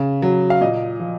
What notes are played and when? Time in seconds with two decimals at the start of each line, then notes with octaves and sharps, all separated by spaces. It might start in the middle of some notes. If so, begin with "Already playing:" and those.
Already playing: C#3
0.22 F#3
0.50 F5
0.61 A#2 D#5
1.00 F3